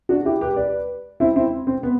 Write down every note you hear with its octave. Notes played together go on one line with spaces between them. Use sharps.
D4 F#4
E4 G4
G4 B4
B4 D5
C4 E4
C4 E4
C4
B3